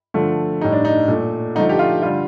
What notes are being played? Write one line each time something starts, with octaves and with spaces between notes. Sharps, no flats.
D3 F3 A3
A2 G3 D#4
D4
D#4
A#2 A3
D3 F3 A3 D#4
G4
F4
D3 G3 F4